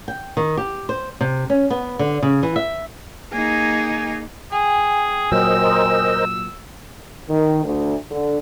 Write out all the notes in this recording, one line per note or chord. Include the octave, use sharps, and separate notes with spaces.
G5
D#3
G4
C5
C3
C#4
B3
D3
C#3
E3
E5
A#3 D#4 G#4 G#5
G#4 G5 G#5
A#2 F#3 A#4 C5 D#5 E6
D#3
D2
D3